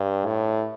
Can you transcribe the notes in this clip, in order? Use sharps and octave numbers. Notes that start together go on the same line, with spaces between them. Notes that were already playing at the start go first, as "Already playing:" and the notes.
Already playing: G2
A2